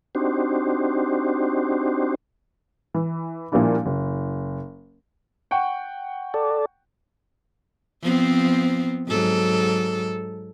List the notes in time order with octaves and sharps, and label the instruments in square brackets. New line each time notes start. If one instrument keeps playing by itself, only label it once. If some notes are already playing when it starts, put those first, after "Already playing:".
[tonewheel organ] C4 D4 D#4 F#4 G4 C5
[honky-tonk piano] E3
A#2 F3 G3 A#3 D4 E4
F#1
[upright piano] F#5 G5 C#6
[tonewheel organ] A4 D5
[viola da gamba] F3 B3 C4
G#2 F#3 A4